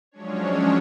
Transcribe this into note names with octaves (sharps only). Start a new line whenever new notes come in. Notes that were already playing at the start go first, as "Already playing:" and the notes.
F3 F#3 G#3 C#4 D4 C#5